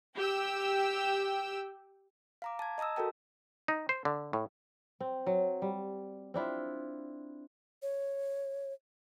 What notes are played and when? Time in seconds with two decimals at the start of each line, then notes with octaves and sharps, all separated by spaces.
0.16 G4 G5 E6
2.42 F5 A#5 D6
2.59 A5 G#6
2.78 D#5 A5 A#5 D#6 E6
2.96 F#4 A4 A#4 G5 A5
3.68 D#4
3.89 C5
4.05 D3
4.33 A2
5.00 C4
5.27 F#3
5.62 G3
6.34 C4 D4 E4 F4
7.82 C#5